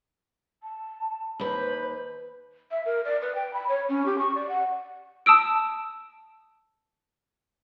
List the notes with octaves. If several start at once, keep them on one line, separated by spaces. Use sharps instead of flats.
A5
D#2 B4 C5 B5
E5
A#4
D5
B4
G5
B5
C#5
C#4
G4
C#6
D5
F#5
A5 D#6 E6 D7